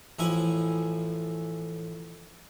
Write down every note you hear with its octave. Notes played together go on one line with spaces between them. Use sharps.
A1 F3 E4 G#5